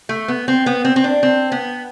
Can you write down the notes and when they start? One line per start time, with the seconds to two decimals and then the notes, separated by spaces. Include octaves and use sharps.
0.09 A3
0.28 B3
0.48 C4
0.66 B3
0.85 C4
0.96 C4
1.04 D4
1.23 C4
1.52 B3